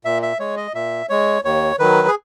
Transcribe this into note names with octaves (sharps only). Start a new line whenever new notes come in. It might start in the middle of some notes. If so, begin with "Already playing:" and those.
A#2 E5
E5
G#3 C#5
D#5
A#2 E5
G#3 C#5
D#2 C#5
D#3 F#3 B4
G#4